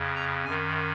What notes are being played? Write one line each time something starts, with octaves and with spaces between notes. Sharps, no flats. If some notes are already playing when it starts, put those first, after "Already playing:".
Already playing: F2 C#3
A#5
F#2 D#3 G#5